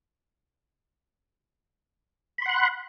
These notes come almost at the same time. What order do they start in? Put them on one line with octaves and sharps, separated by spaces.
B5 C6 F#5 F#6